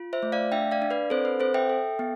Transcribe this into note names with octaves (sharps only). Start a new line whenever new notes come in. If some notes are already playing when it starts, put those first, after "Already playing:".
Already playing: F4
C5 E5
A3
D5 F5
D4 E5 G5
D5 F5
D4
B4 D5
C4 A4 C5
B4
C4 A4 C5
E5 G5
A4
B3